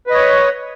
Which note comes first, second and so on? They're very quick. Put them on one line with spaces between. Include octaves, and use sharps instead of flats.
B4 D#5 C#5 F#5